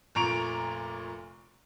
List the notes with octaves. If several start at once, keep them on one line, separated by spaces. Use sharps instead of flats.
F1 A#2 A#5 C#6 D7 F7